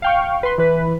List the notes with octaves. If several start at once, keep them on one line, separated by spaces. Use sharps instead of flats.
F5 G5 C#6
B4 C6
E3 B4